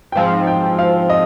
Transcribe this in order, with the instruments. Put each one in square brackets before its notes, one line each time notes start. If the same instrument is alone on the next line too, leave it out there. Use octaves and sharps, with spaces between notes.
[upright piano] G5
[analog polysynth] G#2 F3 C4 [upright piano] F5
[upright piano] G5
F5
D#5